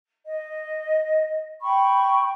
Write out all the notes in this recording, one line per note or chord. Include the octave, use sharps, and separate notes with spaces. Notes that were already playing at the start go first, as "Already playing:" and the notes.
D#5
G5 B5 C#6